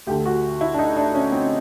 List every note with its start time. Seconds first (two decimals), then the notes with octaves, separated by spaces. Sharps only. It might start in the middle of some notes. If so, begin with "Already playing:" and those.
0.06 D2 D3 G4
0.26 F#4
0.61 E4
0.74 D4
0.78 D#4
0.97 D4
1.15 C#4
1.32 C4